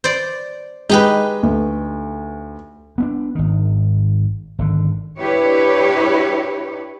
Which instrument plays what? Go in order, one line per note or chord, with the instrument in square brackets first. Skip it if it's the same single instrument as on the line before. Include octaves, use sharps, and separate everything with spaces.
[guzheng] C5 D5
[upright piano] G#3 [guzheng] D#4 G4 B4
[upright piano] D2
[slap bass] B3 C#4 D4
G#1 D#3
G#1 D3
[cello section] D4 E4 G4 B4 C#5